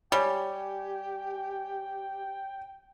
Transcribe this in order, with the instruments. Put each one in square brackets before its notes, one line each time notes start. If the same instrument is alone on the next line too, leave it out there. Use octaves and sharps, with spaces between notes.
[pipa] G3 [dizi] G4 [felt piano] C#5 G#5 [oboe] G5